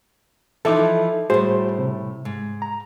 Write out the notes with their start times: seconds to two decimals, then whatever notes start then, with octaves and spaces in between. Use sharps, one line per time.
0.65 E3 F3 D#4 A4 E5 D6
1.30 A2 G3 F#4 G#4 C5
1.79 C3
2.25 G#2
2.62 A#5